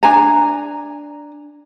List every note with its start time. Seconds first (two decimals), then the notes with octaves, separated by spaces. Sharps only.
0.03 D4 G#5 A#5